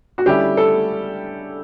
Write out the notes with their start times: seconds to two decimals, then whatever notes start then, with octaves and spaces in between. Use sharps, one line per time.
0.18 F#4
0.26 D3 G3 C#4 E4 G4
0.57 A4